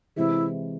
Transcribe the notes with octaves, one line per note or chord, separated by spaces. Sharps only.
C3 E3 G#3 E4